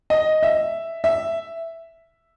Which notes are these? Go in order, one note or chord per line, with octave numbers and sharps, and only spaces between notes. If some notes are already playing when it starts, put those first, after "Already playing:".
D#5
E5
E5